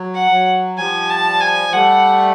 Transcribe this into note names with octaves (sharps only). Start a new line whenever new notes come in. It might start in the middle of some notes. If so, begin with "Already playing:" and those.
Already playing: F#3
F#5
F#3
F3 G3 G#5
A5
G#5
G3 A3 F#5